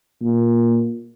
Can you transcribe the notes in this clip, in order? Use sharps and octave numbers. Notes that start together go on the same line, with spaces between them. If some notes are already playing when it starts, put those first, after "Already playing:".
A#2